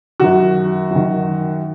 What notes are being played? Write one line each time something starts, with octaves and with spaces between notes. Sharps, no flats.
F#2 D#3 F#4
F#2 D#3